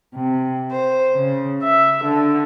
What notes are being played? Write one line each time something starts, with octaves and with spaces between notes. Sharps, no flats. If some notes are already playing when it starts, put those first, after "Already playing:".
C3
C5
C#3
E5
D3